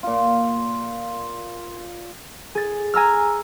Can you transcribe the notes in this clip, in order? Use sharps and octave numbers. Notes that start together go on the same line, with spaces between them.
A#2 F4
G#4 A6
G#5 A#5 E6 F6